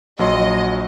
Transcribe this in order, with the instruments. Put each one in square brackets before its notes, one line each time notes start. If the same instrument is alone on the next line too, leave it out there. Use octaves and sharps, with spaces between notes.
[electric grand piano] A#1 F#3 C6 [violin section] D#5